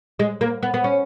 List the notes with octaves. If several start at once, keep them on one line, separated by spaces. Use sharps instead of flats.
G#3
A#3
B3
B3
C#4